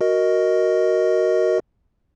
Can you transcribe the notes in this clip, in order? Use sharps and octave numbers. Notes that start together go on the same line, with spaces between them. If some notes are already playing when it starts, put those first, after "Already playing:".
F#4 A#4 D#5